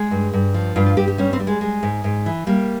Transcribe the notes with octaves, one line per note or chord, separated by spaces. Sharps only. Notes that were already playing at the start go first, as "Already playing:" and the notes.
Already playing: G#3 G#4
G2
G2
F3
G2 F4
F4
G2 G4
G4
G3 C#4
C4
G3
G#3
G#3
G#2
G#2
E3
G3 A#3